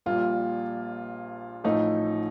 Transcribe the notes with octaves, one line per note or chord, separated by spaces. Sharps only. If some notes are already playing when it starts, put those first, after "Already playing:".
A#1 A#2 G3 F4
A1 A2 F3 A3 D#4